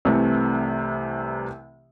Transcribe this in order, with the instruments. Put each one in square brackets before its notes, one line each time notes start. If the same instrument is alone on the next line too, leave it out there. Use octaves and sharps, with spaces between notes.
[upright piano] C2 C3 E3 A3